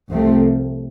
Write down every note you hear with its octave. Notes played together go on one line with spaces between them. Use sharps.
C2 C3 F3 A3 C4